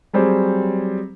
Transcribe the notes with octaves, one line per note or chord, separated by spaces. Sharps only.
F#3 G3 C4 G#4 C5